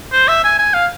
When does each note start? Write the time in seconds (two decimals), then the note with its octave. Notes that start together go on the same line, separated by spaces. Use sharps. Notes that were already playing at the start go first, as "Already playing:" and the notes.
0.12 C5
0.28 E5
0.44 G#5
0.59 G#5
0.74 F5